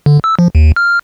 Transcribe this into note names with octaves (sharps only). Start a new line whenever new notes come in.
D3
E6
F3
D#2
F6